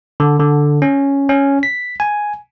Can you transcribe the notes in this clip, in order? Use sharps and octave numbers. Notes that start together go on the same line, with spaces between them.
D3
D3
C#4
C#4
B6
G#5